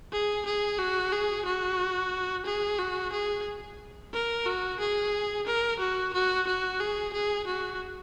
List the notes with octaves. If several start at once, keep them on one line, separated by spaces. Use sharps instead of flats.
G#4
G#4
F#4
G#4
F#4
G#4
F#4
G#4
A#4
F#4
G#4
A#4
F#4
F#4
F#4
G#4
G#4
F#4